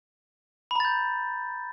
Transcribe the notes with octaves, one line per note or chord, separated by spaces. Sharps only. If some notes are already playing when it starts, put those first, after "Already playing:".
A#5 B5 G6 A6